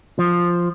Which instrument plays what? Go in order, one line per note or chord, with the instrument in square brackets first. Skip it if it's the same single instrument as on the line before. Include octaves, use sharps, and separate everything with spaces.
[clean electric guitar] F3